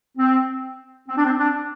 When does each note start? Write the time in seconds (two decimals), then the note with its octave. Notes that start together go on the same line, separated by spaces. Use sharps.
0.18 C4
1.08 C4
1.17 D4
1.25 C4
1.39 D4